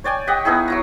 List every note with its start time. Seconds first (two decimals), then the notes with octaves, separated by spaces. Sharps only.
0.04 C#5 D5 G5 G#5
0.27 G4 D#5 F#5 G5
0.45 B3 D#4 E4 G#4
0.68 F#3 E4 A#5